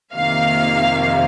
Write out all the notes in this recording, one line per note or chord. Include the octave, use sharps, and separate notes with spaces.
F2 C3 D#3 A#3 F5